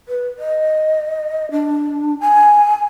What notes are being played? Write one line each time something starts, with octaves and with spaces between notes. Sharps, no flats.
B4
D#5
D4
G#5